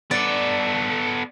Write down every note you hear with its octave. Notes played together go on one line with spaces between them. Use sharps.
B3 A4 D5